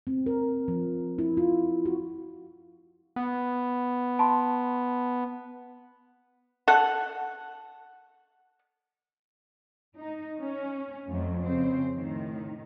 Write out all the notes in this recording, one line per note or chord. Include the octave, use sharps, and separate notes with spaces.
C4
A#4
F3
E4
F4
F#4
B3
A5 B5 C6
A4 F#5
D#4
C#4
F2 F3 F#3 A3
C#3 C4 C5
A2 D#3